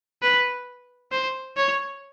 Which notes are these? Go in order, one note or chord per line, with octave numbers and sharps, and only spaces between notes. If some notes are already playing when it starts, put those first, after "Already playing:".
B4
C5
C#5